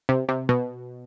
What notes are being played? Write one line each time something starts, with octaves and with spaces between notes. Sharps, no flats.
C3
C3
B2